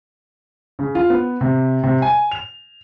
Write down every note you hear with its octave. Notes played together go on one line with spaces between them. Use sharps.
C#3
F4
B3
C3
C3
G#5
F7